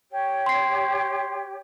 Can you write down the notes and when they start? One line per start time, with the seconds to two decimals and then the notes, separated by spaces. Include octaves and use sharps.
0.11 G4 C#5
0.46 C6 C7